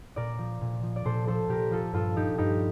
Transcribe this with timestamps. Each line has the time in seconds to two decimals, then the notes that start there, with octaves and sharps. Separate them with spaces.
0.16 A#2 A#4 D5
0.39 F3
0.61 A#2
0.83 F3
0.96 D5
1.05 A#2 A4 C5
1.28 F3 A4 C5
1.48 A#2 G4 A#4
1.70 F3 F4 A4
1.93 G2 F4 A4
2.16 F3 D#4 G4
2.38 G2 D#4 G4